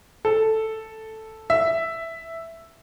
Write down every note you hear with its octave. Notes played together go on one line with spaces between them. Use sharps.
A4
E5